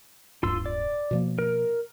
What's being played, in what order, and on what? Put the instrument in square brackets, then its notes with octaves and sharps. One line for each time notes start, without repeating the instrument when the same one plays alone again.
[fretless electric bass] D1 G2 [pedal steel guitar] F4 C6 E6
[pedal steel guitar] D5
[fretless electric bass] B2 F3 A#3
[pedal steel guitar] A#4